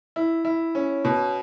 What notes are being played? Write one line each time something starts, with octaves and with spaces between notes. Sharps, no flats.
E4
E4
C#4
B2